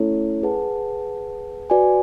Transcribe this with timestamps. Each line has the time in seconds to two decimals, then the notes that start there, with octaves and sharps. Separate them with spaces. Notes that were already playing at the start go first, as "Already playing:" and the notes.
Already playing: A3 C#4 E4 A4 C#5
0.43 G#4 B4 F#5 A5
1.70 F#4 B4 D5 G#5